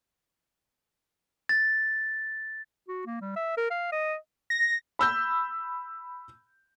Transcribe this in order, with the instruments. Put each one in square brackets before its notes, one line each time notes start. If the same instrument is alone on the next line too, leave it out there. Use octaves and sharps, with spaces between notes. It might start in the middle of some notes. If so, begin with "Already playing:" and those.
[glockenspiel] A6
[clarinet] F#4
A#3
G3
E5
A#4
F5
D#5
[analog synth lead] A#6
[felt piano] B5 E6 G6